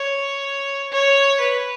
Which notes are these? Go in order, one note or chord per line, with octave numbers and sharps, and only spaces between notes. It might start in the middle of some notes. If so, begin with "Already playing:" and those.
Already playing: C#5
C#5
B4